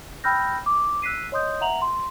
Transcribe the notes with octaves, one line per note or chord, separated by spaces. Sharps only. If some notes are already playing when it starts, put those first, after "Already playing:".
G5 B5 E6 F6 G6 A#6
D6
E6 F#6 B6 C7 D#7
C#5 D#5 C6 D#6 G6
E5 F#5 A#5 F7 F#7
C6